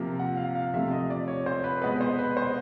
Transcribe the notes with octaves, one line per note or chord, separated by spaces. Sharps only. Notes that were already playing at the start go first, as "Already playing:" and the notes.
Already playing: C3 F3 A#3
F#5
F5
F5
C3 F3 A3 E5
D#5
D5
C#5
C5
B4
B2 G#3 B3 B4
C5
B4
C5